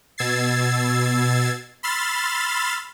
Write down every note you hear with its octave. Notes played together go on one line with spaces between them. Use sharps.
B2 E6 G#6 A6 C7
B5 C6 E6 F6 A6